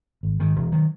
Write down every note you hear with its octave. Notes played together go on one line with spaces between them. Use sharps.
G#1
G#2 D#3
E1
D#3 F#3